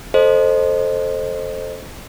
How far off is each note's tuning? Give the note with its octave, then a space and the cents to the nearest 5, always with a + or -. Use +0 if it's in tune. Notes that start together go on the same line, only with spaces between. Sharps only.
A4 +0 C5 +0 D#5 -20